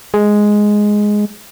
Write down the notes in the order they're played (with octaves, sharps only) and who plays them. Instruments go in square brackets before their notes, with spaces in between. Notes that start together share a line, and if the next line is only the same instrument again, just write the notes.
[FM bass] G#3